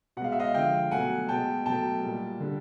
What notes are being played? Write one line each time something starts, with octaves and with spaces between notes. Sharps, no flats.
B2 G#3 F5 F#5
E5
D#5 F5
D3 F3 G#3 F5 G5
B2 F#3 A3 F#5 G#5
B2 G#3 G5 A5
B2 F#3 A3 G5 A5
A#2 G3
D3 G3